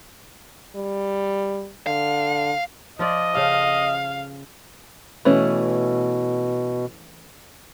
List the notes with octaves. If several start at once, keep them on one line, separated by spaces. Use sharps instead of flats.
G3
D3 F5
F3 F4 D5 D#5
C#3 A4 F5
B2 E3 A3 C#4